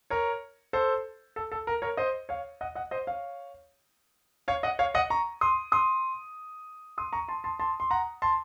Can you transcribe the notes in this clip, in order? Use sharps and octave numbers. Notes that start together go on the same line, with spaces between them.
A#4 C#5
A4 C5
A4
A4
A#4
A#4 C#5
C5 D#5
C#5 F5
D#5 F#5
D#5 F#5
C5 D#5
C#5 F5
C#5 F5
D#5 F#5
C#5 F5
D#5 F#5
A#5 C#6
C6 D#6
C6 D#6
C6 D#6
A#5 C#6
A5 C6
A5 C6
A5 C6
C6
F#5 A#5
A5 C6